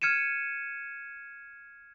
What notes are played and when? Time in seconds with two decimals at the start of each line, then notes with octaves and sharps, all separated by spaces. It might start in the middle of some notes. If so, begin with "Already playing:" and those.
0.02 F6 G#6 C#7 D#7 E7